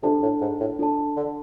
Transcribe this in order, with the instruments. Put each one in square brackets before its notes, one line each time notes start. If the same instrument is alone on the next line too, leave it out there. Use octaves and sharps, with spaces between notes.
[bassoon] C3 [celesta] D4 F4 A4 D5 A5
[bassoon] A2
G#2
A2
[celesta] D4 F4 A4 D5 A5
[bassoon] D3